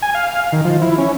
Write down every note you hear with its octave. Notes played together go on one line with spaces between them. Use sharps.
G#5
F5
D#3
F3
E4
C#4